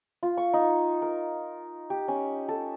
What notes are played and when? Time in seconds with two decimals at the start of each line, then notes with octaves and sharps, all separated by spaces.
0.23 F4
0.37 C#6
0.53 D#4
1.02 A#4
1.90 G4
2.08 C#4
2.48 A4